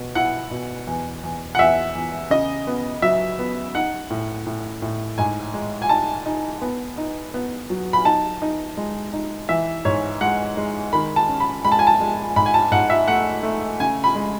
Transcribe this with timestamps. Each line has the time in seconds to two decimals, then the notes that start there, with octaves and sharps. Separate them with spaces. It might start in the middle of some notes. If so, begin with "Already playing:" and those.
Already playing: B2
0.15 E4 F#5
0.51 B2
0.87 E2
1.23 E2
1.55 F#5
1.59 E2 E5
1.95 E2
2.30 C#3 D#5
2.67 B3
3.02 F#3 E5
3.39 B3
3.74 D#4 F#5
4.10 A2
4.46 A2
4.82 A2
5.18 G#2 G#5
5.54 G#3
5.82 G#5
5.89 D#4 A5
6.26 D#4
6.62 B3
6.97 D#4
7.34 B3
7.70 F#3
7.93 B5
8.05 D#4 A5
8.42 D#4
8.77 G#3
9.13 D#4
9.49 E3 E5
9.85 G#2 C#5
10.21 G#3 F#5
10.57 G#3
10.93 D#3 B5
11.16 A5
11.29 C#4
11.40 B5
11.65 G#3 B5
11.72 A5
11.79 G#5
11.87 A5
12.01 G#3
12.36 G#2 B5
12.46 G#5
12.54 A5
12.71 G#2 F#5
12.90 E5
13.08 A3 F#5
13.43 A3
13.80 C#3 G#5
14.04 B5
14.15 G#3